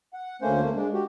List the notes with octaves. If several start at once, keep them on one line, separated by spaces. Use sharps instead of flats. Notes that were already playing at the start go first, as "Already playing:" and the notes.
F#5
D2 A3 A#3 C#4 C5
A3 A#3
G#3 D4
F#4 G4